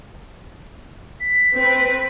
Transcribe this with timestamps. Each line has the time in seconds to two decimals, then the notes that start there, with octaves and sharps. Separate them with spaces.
1.20 B6
1.56 C4 B4